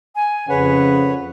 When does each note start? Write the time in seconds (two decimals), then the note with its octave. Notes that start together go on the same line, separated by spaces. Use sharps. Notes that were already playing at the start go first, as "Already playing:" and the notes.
0.15 G#5
0.49 F2 C#3 B4 C#5 F#5